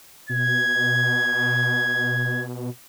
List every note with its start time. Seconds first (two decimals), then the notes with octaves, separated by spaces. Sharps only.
0.29 B2 G#6